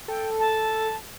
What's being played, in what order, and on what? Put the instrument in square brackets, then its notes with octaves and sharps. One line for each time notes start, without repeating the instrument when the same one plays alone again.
[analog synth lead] A4 [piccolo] G5
[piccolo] A5